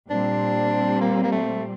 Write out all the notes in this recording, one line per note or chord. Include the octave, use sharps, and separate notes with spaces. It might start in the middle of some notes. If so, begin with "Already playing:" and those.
A#2 G3 C4 D4
A#3
A#3
A3